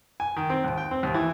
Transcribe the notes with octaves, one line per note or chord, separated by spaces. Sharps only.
G#5
D#3
C4
D#2
G5
C4
D#2
E3